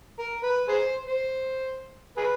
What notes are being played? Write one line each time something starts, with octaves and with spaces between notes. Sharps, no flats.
A#4
B4
G#4 C5
C5
G#4 B4